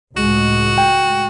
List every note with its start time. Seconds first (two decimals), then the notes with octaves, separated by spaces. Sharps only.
0.17 C#2 A2 G#3 F#4
0.78 G5